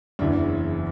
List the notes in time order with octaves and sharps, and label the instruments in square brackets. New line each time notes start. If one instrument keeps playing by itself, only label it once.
[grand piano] F#1 E2 C#3 E3 D4